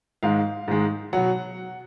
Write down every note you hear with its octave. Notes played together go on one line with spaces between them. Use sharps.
G#2 D#3 G#3 F5
G#2 D#3 G#3
B2 F#3 F#5